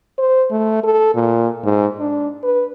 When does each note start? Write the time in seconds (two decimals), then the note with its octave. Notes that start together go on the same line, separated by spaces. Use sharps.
0.19 C5
0.51 A3
0.84 A4
1.15 A#2
1.64 G#2
2.00 D4
2.44 B4